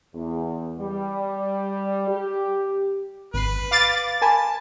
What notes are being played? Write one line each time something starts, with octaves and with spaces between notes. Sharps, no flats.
E2
G3
G4
G#1 B4 C7
F5 D6 A6
A#4 G#5 A5 B5